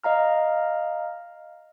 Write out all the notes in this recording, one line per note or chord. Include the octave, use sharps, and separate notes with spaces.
D#5 F5 A#5 F6